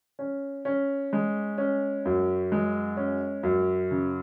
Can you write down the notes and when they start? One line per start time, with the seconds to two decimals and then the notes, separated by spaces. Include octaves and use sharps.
0.19 C#4
0.65 C#4
1.13 G#3
1.58 C#4
2.05 F#2
2.52 G#3
2.97 C#4
3.43 F#2
3.91 C#3